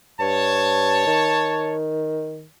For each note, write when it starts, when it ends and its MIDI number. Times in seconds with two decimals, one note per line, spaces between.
0.20 1.04 43
0.20 1.74 73
0.20 1.74 81
1.07 2.46 51